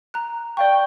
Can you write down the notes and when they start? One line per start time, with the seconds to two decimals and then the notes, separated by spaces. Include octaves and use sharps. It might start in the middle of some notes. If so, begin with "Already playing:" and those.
0.14 A#5 F#6
0.57 D5 F5 G5 C#6